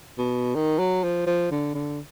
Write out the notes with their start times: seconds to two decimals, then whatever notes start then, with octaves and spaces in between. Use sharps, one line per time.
0.18 B2
0.55 D#3
0.79 F#3
1.03 F3
1.27 F3
1.51 D3
1.74 D3